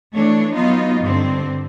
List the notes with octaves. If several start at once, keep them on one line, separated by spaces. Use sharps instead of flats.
E3 A3 D4 C#5
F#3 B3 D#4 F4
G2 D3 C4